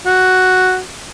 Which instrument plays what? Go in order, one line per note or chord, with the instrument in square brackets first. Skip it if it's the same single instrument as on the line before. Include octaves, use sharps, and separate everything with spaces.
[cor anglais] F#4